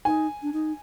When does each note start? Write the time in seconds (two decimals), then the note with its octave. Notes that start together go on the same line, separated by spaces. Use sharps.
0.05 D#4 G#5
0.42 D4
0.53 D#4